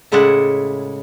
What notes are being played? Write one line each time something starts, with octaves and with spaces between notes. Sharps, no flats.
A2 C#3 G#3 E4 D5 F#5